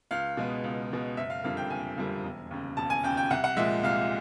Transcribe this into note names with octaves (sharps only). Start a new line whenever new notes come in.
C#2 F5
B2 G#3 B3
C#2
B2 G#3 B3
F#1 E5
F5
F2 D3 G3 A#3 F5
G5
F#1 G#5
F2 D3 G3 A#3
E1
D#2 C#3
E1 A5
G#5
D#2 C#3 G5
G5
C2 F#5
F#5
A#2 F3 G#3 E5
C2 F5